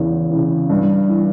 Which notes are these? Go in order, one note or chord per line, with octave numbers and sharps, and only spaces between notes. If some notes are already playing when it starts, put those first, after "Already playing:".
Already playing: E2 C#3 E3
C#3 E3
G2
E3